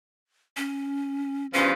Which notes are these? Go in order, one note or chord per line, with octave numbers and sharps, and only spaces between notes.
C#4
E2 G2 F3 C#4